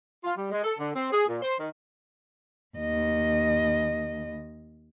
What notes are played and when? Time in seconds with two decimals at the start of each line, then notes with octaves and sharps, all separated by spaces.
0.24 F4
0.37 G3
0.51 G#3
0.64 A4
0.78 D3
0.94 C4
1.11 G#4
1.27 A#2
1.42 C5
1.59 D#3
2.77 D#2 D#5